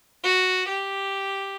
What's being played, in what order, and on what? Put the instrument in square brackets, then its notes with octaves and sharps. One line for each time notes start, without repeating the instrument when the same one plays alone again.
[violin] F#4
G4